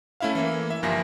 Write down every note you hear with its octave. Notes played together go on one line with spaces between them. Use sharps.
A3 C#4 E4 E5 F5
E3 A#3
E5
G1 G2 F3 A#3 G#5 A#6